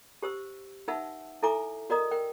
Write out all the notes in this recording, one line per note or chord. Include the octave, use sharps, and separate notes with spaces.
G4 C5 E6
D#4 B4 E5 F#5 A5 E6
E4 A4 E5 G#5 A#5 D6
F#4 A#4 D5 D#5 A#5 D#6
A#4 G5